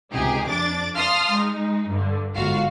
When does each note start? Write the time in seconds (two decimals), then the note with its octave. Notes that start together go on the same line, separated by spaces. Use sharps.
0.12 C#2 C3 D#4 G4 G#4
0.47 F2 D4 D6 A6
0.94 F5 A5 C6 D#6 F6
1.32 G#3 D#4
1.90 G2 D3
2.34 G1 G#2 F4 F#4 F5